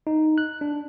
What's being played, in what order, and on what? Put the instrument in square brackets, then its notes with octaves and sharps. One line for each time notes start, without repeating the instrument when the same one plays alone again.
[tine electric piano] D#4
F#6
D4